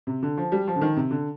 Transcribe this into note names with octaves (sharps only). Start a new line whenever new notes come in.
C3
D3
F3
G3
F3
D3
D#3
C3
D3